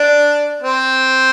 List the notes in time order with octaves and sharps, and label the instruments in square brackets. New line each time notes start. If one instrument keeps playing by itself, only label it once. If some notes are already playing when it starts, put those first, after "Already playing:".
Already playing: [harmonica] D4
C4